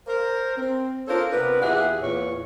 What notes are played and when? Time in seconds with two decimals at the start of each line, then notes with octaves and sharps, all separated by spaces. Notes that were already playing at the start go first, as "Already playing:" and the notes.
0.07 A#4 C5
0.57 C4
1.08 D4 F4 A4 A#4 C5 C#5
1.32 C3 B3 D4 A#4 B4
1.62 E2 F4 G4 G#4 E5 F#5
2.01 E2 A#2 C#5